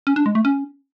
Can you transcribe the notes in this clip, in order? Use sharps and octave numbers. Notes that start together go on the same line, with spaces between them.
C#4
D4
G#3
A3
C#4